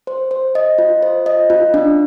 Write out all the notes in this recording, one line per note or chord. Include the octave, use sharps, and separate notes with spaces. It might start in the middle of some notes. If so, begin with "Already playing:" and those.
C5
C5
D#5
F4
C5
D#5
F4
D4